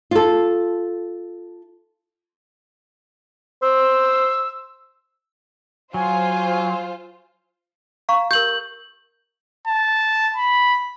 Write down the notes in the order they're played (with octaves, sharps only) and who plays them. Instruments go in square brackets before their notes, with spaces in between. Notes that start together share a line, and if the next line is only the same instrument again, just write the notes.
[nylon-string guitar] F4 A4
[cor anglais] C5 [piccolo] E6
[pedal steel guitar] F#3 [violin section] F4 C5 [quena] G#5
[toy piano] F5 A#5 C#6
[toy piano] G4 A#4 [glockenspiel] G6 F#7
[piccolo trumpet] A5
B5